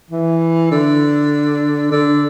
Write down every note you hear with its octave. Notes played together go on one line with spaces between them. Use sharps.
E3
D3
D3